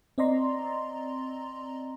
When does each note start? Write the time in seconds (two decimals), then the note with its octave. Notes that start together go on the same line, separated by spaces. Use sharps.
0.18 C4 D5 D#5 A#5 C6